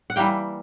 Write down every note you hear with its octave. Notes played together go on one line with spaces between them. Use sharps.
F#5
E3 G3 A#3 G5